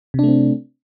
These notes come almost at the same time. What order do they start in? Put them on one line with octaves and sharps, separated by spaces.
C3 D4 A3 C4